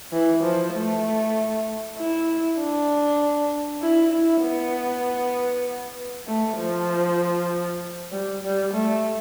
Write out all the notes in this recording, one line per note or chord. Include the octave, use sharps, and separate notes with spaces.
E3
F3
A3
E4
D4
E4
E4
B3
A3
F3
G3
G3
A3